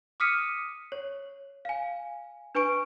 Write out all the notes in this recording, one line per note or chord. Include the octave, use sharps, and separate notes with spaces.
D6 D#6 F6 B6 C#7 D#7
C#5
F5 G#5
D4 B4 G#5 C#6 D7